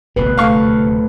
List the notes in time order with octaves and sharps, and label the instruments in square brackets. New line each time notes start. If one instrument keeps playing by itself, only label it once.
[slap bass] D1 C3 [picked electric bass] A#1 B3 [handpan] B4
[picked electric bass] D#1 A3 [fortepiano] F5 C#6